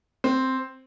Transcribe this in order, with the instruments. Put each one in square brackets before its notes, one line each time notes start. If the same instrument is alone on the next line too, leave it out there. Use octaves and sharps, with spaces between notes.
[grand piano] C4